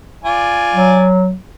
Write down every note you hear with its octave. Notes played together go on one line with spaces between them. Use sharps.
F4 D5 G#5
F#3